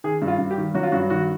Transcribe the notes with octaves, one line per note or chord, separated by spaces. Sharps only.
D#3 G#4
G2
F4
G2
G4
D#3
F#3 F#4
F4
G2 F#4
D#3 F#4